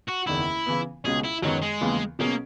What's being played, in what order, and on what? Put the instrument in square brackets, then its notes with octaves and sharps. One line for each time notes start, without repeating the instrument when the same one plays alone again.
[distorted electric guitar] F#4
[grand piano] F#1 E2 D#3 [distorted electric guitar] E4
[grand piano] C#3 E3 B3
[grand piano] C#2 B2 G#3 C#4 [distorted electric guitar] G#4
[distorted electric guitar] E4
[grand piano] F#2 D#3 G#3 B3 [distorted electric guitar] F#3
[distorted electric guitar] G#3
[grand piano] D#2 C#3 E3 B3
[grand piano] B2 F#3 C#4 G#4 [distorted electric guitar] A#3